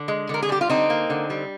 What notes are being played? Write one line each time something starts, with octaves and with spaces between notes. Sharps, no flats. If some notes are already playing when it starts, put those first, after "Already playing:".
Already playing: D3
G#3
D3 A#4
G#4
G3 G4
F4
D3 C4 D#4
A#3
D3
G3